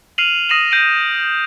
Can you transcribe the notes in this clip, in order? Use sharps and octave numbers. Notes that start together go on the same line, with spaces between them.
F6 C7 D#7 F7 F#7
D#6 A#6 C7 D#7 E7 F#7
G6 A#6 C7 D7 D#7 F#7